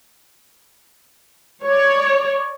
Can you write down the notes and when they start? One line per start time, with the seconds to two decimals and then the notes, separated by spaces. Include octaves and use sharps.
1.65 C#5 D5